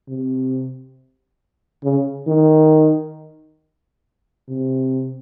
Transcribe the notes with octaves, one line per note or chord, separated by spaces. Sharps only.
C3
C#3
D#3
C3